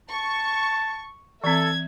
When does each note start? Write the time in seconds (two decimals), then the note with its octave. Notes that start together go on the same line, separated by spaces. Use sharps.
0.10 A5 C#6
1.44 E3 C4 A4 E5 G#6